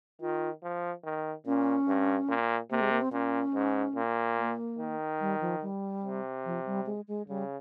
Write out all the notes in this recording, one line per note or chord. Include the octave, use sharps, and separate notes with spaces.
D#3 F4
F3
D#3
A#2 C#4
G2
A#2
C3 A#3
G#3
A#3
C4
A#2 C#4
G#2
A#2
A#3
D#3
G3
F3
G3
C3
F3
G3
G#3
G#3
C#3 G3